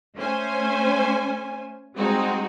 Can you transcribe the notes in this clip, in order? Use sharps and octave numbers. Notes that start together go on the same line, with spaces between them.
A3 C#4 C5 G#5
G3 G#3 C4 D#4 F#4